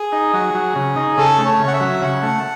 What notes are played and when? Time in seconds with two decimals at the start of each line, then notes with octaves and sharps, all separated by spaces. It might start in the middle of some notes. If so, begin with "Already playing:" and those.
Already playing: G#4
0.12 D#4
0.34 F#3
0.54 F#3
0.76 C#3
0.96 D#4
1.18 C#3 A4
1.38 A3
1.45 C#5
1.59 C#3
1.67 F#5
1.73 E5
1.80 F#3
2.02 C#3 F#5
2.22 A3